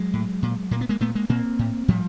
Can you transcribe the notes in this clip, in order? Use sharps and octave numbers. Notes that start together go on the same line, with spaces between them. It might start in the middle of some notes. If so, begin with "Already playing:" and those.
Already playing: F#3 G#3
A2
A#2
A#2 A#3
B3
G#3 A#3
A#2 A3 B3
G#3 A#3
A#2 A#3 C4
A2
A2 F3 G3